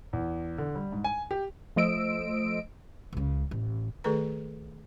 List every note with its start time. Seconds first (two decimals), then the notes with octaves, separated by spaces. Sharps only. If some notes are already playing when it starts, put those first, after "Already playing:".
0.13 E2
0.58 D3
0.75 G3
0.92 G#2
1.04 G#5
1.31 G4
1.76 F3 A3 C5 D#5 E6 D7
3.13 C#2 C#3
3.51 A1
4.04 D#3 A3 G#4 A4 B4 A#5